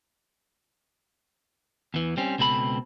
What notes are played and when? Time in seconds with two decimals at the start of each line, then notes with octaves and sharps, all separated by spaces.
1.94 E2 E3
2.17 G3 C4 C#4
2.39 C#2 B2 C4 A4 B5